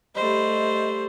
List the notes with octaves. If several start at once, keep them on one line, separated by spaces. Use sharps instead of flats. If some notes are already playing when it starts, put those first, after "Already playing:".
G3 A3 C5 D#5